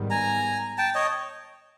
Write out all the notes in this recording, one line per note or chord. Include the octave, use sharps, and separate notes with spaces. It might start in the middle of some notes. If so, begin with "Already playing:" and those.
Already playing: G#2 D#3 G3 B3
G#5 A#5
G5 A5
C#5 D#5